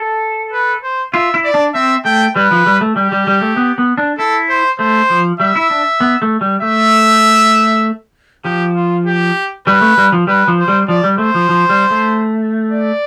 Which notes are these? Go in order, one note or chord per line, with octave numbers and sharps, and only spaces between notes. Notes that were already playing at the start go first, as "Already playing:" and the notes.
Already playing: A4
B4
C5
F4 E5
E4
D5
D4
C4 E5
A3 G5
G3 B4
F3
G3
A3
G3 G4
G3
G3
A3
B3
B3
D4
E4 A4
C5
A3 C5
F3
G3 E5
E4
D4
B3
A3
G3
A3 E5
F3 G4
F4
G4
G3 B4
A3
G3
F3
G3 B4
F3
C5
G3
F3 D5
G3
A3 C5
F3
F3
G3
A3
D5